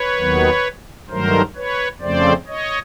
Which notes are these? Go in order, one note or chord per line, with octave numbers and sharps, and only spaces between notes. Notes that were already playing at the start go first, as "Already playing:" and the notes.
Already playing: B4 C#5
D#2 D#3 F#3 B3
G2 D#3 F#3 A3 A#4 C5
B4 C#5
F2 C#3 F3 A3 C4 C5 D5
C#5 D#5